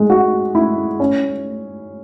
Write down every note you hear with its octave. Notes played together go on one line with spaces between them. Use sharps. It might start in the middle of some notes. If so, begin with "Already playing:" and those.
Already playing: G#3
F#4
E4
C#4